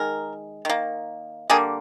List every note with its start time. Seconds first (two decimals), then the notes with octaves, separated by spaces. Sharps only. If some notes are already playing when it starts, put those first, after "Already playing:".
Already playing: D#3 G#3 A#4
0.65 D#3 A#3
1.50 D3 G3 A#3 G#4